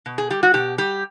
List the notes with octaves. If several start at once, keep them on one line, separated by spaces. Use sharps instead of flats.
B2
G#4
G3 G4
F#4
B2 G4
G3 G4